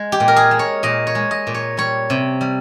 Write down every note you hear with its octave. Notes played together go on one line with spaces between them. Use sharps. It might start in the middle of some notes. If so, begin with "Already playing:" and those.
Already playing: G#3
G4
A#2
A#4
G#4
G#3
C#5
A#2 D#5
C#5
G#3
D#5
A#2
C#5
G3 C#5
C3
G3